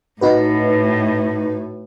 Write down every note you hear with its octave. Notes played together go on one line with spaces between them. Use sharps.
A2 D#4 F#4 B4